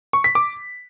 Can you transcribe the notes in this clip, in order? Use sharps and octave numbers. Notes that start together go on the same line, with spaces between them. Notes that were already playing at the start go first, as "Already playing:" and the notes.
C#6
B6
D6